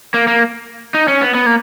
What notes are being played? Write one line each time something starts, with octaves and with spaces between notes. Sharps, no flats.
A#3
A#3
D#4
C#4
B3
B3
A#3